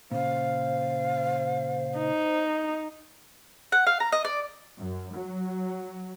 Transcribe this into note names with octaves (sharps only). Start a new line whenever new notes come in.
A#2 C#3 C5 F5
D#4
F#5
F5
A#5
D#5
D5
F#2
F#3